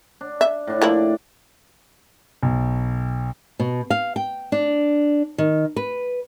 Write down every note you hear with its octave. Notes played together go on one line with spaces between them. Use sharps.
D4
E5
A2 D4
F3 A#3 E4 D5
B1
B2
F5
G5
D4
D#3
B4